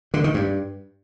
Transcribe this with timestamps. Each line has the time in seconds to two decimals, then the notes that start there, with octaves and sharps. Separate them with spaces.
0.14 D3
0.24 D#3
0.34 G2